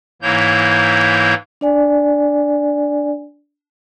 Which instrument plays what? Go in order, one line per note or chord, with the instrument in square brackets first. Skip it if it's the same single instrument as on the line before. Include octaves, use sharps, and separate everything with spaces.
[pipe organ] G#2 E3 A#3 E4 C#5 G6
[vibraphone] D4 D5 G#5